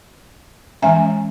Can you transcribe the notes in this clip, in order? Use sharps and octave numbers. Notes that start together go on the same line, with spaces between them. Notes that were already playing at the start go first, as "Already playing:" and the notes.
E3 G#3 C#4 E5 G#5